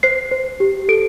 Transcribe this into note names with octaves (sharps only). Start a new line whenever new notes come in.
C5 C7
C5
G4
A4 D7